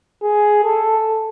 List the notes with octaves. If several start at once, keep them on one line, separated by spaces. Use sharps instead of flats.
G#4
A4